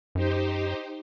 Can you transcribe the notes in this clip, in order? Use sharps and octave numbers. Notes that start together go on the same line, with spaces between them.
F#2 D#4 G4 C5